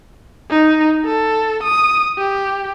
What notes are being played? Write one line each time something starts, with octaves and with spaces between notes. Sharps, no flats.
D#4
A4
D#6
G4